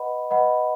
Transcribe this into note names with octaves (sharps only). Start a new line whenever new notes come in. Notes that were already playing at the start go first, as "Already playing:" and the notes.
Already playing: B4 D#5 F#5 B5
B4 D#5 F#5 B5